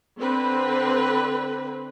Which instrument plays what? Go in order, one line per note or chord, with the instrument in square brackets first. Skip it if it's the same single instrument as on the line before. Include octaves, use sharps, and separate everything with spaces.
[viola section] D3 C4 B4